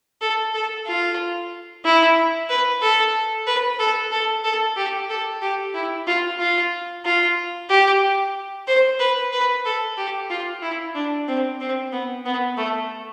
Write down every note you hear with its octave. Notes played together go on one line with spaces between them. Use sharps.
A4
A4
F4
E4
B4
A4
B4
A4
A4
A4
G4
A4
G4
E4
F4
F4
F4
G4
C5
B4
B4
A4
G4
F4
E4
D4
C4
C4
B3
B3
A3